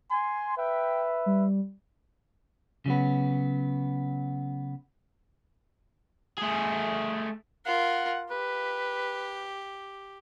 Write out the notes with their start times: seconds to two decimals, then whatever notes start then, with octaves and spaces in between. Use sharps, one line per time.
0.12 G#5 C6
0.58 B4 E5 G5
1.26 G3
2.86 C#3 F#3 B3
6.38 A3 G#4
7.66 F4 A#4 F#5
8.31 G4 B4